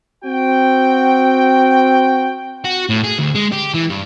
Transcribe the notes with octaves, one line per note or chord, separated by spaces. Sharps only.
C4 F#4 G5
F#4
A2
G#4
D2
G#3
G4
E3
G2